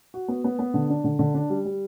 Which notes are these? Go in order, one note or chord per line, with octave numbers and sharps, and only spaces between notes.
F#4
B3
B3
B3
D3
D4
D3
D3
D4
G3
G3